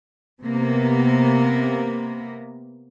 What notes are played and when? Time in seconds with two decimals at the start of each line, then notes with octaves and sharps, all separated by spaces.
0.42 C3 A#3 B3